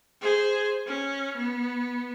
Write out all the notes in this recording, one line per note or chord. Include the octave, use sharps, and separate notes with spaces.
G#4 C5
C#4
B3